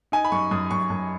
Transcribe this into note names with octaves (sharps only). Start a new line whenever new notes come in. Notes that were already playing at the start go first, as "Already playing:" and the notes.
D#4 G#5
B5
F#2 C#6
F#2 D#6
F#2 C#6
F#2